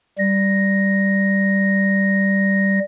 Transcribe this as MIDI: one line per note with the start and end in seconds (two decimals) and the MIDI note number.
0.18 2.79 55
0.18 2.79 94